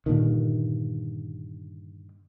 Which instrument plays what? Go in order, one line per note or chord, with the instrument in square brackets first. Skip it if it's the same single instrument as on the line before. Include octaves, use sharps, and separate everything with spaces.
[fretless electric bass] G2 A#2 D3 D#3